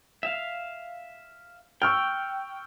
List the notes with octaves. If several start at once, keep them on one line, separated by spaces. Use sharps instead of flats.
E5 F5
G5 C#6 E6 F6